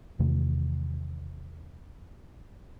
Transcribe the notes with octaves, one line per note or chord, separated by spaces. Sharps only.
E2 C3 D#3 A3